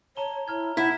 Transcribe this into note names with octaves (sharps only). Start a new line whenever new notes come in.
C#5 A5 A#5 G7
E4 A#5 F6 G#6
E4 F#5 B6 E7